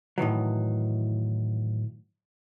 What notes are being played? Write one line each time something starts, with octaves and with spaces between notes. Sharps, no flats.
A2 D#3 E3 F#3